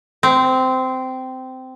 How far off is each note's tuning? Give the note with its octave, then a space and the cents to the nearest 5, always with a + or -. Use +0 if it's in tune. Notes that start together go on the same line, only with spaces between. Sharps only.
C4 -15